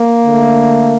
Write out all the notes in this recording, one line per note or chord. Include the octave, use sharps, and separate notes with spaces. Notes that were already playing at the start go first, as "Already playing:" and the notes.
Already playing: A#3
D3 A3